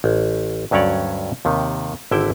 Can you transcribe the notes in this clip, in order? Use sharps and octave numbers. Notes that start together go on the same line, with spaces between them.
A1
D2 G2 F#3 C#4 C#5 D5
D#2 C3 D#3
G#1 D3 E4 E5 G5